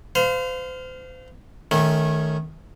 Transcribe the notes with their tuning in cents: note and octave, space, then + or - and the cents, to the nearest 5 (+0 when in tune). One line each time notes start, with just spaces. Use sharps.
C5 -35 F5 +0
D#3 +0 A3 -20 C#4 +0